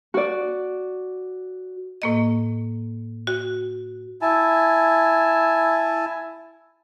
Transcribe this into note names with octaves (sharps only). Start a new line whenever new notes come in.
F#4 D5
A2 A#3 D#5
F#4
E4 G#5 A5